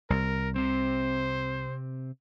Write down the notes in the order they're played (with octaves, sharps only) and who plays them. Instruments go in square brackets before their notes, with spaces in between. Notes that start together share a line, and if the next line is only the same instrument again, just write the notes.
[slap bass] C2 [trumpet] A#4
[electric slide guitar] C3 C4 [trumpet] C5